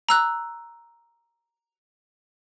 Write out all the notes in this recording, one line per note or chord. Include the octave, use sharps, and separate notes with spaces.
A#5 E6 F#6